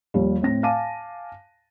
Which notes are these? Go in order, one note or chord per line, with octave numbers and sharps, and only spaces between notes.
D#2 F3 G3
A2 C4 A#6
F5 G#5 A5 D6 D#7